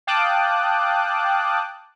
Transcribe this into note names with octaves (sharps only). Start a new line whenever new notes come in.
F5 G5 A5 D6 D#6 F#6